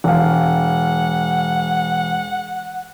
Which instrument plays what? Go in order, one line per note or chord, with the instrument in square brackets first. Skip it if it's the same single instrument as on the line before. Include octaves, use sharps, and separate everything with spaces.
[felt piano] E1 F5 [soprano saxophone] F#5